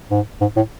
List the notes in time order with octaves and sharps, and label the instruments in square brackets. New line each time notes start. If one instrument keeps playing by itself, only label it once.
[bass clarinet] G#2
G#2
A2